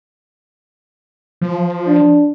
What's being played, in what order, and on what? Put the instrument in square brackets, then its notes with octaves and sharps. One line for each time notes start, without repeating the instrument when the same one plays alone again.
[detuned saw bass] F3
[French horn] D4